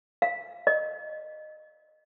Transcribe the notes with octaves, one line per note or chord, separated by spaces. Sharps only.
F5
D#5